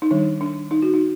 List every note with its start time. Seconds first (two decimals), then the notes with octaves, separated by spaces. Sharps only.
0.02 D#4
0.11 D#3 G3 D4
0.41 D4
0.71 D#4
0.82 F#4
0.94 D#4